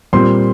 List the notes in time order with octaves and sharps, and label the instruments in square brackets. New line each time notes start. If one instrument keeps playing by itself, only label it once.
[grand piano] A#2 G3 C4 C6